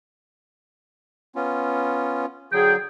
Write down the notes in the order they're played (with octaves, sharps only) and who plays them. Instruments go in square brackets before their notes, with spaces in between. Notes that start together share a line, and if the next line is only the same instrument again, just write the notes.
[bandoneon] B3 C#4 F4
[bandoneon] D3 F#3 [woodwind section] G#4 G5